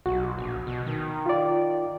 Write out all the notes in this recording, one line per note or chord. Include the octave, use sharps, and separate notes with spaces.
B1 F#4
A#1
B2
D#3
F4 D5